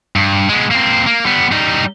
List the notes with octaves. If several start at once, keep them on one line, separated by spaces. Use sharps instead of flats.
G2
G#3 B3
A#3 C4
A#3
G3 B3
G3 D#4